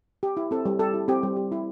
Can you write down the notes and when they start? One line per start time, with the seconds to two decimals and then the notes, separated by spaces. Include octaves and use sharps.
0.23 G4
0.37 E4
0.51 C4 A4
0.65 G3
0.79 G4 A4
0.94 E4
1.08 C4 G4
1.23 G3
1.36 G4
1.52 E4